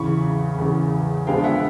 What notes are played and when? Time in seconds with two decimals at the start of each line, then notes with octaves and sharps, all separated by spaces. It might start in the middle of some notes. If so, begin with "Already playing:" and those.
Already playing: E2 C#3 E3 B5 C#6
0.58 E2 C#3 E3
1.26 D3 F3 G#3 B3 D4 F5 G5
1.38 F5
1.44 E5 F#5